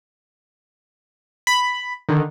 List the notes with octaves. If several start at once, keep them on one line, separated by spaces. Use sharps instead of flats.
B5
D3 D#3